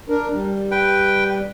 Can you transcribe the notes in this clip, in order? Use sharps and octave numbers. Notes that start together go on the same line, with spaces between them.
D4 A#4
G3
B4 G5